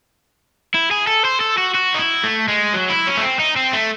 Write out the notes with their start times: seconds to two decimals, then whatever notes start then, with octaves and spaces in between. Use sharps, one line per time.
0.74 E4
0.91 G#4
1.07 A4
1.25 C5
1.40 A4
1.58 F#4
1.74 F#4
1.94 D#4
1.99 E4
2.24 A3
2.48 G#3
2.73 F#3
2.90 E4
3.07 C#4
3.17 A3
3.23 C4
3.39 D#4
3.56 C4
3.73 A3